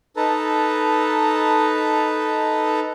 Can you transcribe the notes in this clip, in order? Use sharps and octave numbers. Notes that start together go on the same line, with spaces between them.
D#4 A4 B4 A5 A#5